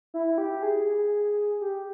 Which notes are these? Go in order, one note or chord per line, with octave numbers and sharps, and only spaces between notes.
E4
G4
G#4
G4